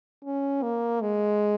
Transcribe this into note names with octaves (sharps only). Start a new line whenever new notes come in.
C#4
A#3
G#3